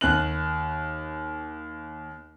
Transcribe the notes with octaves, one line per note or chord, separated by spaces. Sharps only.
D#2 F#6 F#7